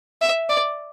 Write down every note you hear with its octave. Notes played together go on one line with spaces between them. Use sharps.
E5
D5